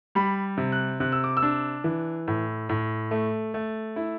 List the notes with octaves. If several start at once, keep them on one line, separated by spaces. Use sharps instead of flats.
G3 B5
C3
F#6
C3 F#6
E6
D6
E6
D4
E3
A2
A2
A3
A3
E4